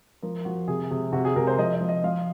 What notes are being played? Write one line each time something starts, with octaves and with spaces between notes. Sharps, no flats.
F3 A#4
F3 F#4
C3 G#4
C3 G#4
C3 F#4
G#4
C3 A#4
C5
F3 D#5
D#5
F3
D#5
F3 F5